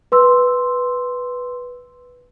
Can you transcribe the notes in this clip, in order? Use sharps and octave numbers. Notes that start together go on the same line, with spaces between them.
B4 C6 E6